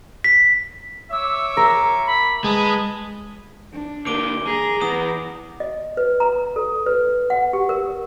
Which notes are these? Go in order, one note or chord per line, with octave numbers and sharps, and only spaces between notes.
B6
C#5 E5 D6 E6
A#4
B5
G#3 B4 A5 B5 D#6
D4
D3 A#3 D6 D7 G7
G#4 A#5
E3 B3 D#6
D#5
B4
A#5
A4
B4
F#5
G4
A#4